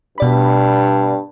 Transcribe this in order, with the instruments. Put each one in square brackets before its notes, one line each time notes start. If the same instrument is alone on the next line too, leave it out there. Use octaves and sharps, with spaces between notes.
[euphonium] G2 [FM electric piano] B2 D5 B5